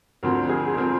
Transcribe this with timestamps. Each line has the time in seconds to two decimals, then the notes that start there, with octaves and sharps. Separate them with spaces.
0.23 D2 D3 F3 C4 A#4
0.49 G#4
0.74 D3 F3 C4 A#4